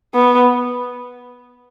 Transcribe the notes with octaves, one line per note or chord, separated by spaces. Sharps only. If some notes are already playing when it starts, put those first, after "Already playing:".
B3